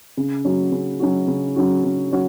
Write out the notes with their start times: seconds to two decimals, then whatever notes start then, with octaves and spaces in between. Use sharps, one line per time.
0.17 C#3
0.45 F#3 C#4 F#4
0.72 C#3
1.00 F#3 C#4 F#4
1.28 C#3
1.56 F#3 C#4 F#4
1.84 C#3
2.12 F#3 C#4 F#4